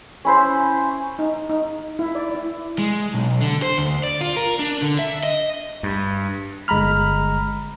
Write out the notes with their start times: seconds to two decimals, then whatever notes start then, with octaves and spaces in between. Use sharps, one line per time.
0.25 C#4 E4 C5
1.19 D#4
1.50 D#4
1.99 E4
2.15 D5
2.35 E4
2.79 G#3
3.14 B1
3.41 D3
3.62 C5
3.78 D2
4.04 D5
4.21 F4
4.36 A#4
4.59 D4
4.82 D3
4.99 E5
5.23 D#5
5.83 G2
6.68 G1 G#3 A#5 B5 F6